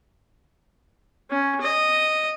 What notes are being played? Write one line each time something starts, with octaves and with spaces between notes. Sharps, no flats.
C#4
D#5